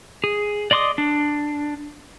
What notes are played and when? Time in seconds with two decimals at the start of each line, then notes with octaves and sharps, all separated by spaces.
0.24 G#4
0.71 D5 D#5 C6 D6 D#6
0.98 D4